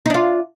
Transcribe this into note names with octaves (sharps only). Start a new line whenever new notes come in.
D4 D#4 F4